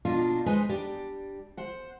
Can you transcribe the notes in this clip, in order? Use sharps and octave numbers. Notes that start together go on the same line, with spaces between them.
B2 A#3 D4 D#4 F4
G#3 D#4 B4 C5 G#5
G3 D4 G4 D5
C5 F#5